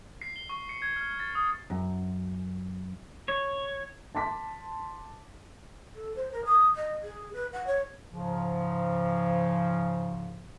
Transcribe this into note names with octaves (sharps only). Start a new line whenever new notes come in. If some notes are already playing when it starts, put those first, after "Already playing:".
C7
G7
C#6
C#7
G#6
F6
A6
D#6
F#2
C#5
A5 C6 D6 B6
A4
C5
A#4
D#6
D#5
G#4
B4
F#5
C#5
G#2 C#3 F3